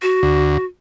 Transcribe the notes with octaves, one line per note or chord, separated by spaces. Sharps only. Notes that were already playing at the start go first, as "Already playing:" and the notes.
F#4
D2